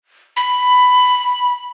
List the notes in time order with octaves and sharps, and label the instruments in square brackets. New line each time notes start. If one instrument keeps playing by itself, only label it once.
[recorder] B5